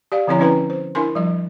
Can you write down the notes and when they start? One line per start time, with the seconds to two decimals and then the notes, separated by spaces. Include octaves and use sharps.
0.12 G4 D5 F5
0.27 D3 F3 C4 E4 C#5 A#5
0.39 C4 C#4 E4 B4 G5 A#5
0.70 C5
0.95 D4 E4 A#4 G#5 C6
1.15 F3 G3 D#5